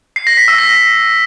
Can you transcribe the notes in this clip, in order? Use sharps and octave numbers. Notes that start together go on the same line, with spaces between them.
C7
A#6
B6
E6
A#6